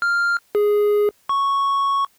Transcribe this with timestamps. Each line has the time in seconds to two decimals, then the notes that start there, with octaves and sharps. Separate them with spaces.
0.02 F6
0.55 G#4
1.29 C#6